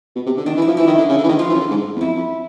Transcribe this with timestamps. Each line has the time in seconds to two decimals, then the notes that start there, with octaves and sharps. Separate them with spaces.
0.16 B2
0.26 C3
0.37 D3
0.46 D#3 D4
0.56 E3
0.62 E4
0.67 F3
0.77 E3 E4
0.87 D#3
0.98 D3
1.09 C#3
1.18 D3
1.24 E3
1.29 D#3
1.39 F3 F4
1.49 E3
1.54 C#3
1.60 D3
1.70 G#2
1.96 E2
2.00 F2 E4
2.15 F2